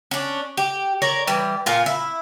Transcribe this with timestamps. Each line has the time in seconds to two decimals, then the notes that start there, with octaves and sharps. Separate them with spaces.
0.11 C#4 D4
0.57 G4
1.02 A#4 C#5 D5
1.27 E3 G3
1.66 A#2 F4 G#5
1.86 E4